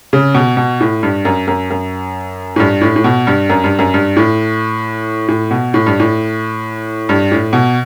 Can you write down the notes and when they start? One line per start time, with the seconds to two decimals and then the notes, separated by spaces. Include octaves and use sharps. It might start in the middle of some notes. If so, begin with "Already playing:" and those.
0.13 C#3
0.34 B2
0.57 B2
0.81 A2
1.03 G2
1.25 F#2
1.48 F#2
1.70 F#2
2.56 A2
2.60 G2
2.81 A2
2.96 A2
3.04 B2
3.27 G2
3.49 F#2
3.64 G2
3.79 F#2
3.94 G2
4.17 A2
5.28 A2
5.51 B2
5.74 A2
5.86 G2
6.00 A2
7.09 G2
7.32 A2
7.53 B2